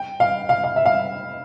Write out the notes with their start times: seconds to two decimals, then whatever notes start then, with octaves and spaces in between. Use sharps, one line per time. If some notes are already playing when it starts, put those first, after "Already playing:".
Already playing: G5
0.20 F5
0.49 F5
0.64 F5
0.76 E5
0.85 F5